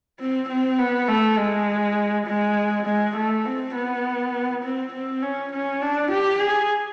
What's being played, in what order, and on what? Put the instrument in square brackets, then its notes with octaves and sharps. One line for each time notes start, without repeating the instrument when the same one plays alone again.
[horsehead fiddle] C4
C4
B3
A3
G#3
G#3
G#3
A3
C4
B3
C4
C4
C#4
C#4
D4
G4
G#4